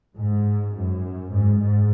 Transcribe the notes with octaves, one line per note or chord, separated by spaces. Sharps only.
G#2
F#2
G#2
G#2